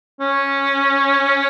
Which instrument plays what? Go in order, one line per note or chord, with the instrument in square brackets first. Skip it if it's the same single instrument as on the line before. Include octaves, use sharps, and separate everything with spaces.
[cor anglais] C#4